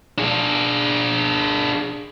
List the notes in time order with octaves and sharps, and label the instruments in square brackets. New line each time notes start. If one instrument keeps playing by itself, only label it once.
[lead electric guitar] D4 G#4